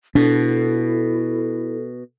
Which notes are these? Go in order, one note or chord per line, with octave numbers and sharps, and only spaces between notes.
B2 D4 E4 A4